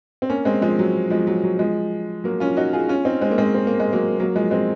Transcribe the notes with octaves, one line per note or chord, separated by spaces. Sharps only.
C4
A#3 C#4
G#3 C4
F3 G#3
F#3
F3 G#3
F#3
F#3
F3 G#3
F#3 A#3
C#4 F4
D#4 F#4
F4 G#4
C#4 F4
C4 D#4
G#3 C4
A#3
G#3 C4
C4
A#3
G#3
F#3 A#3
F#3 A#3
F3 G#3
G#3 C4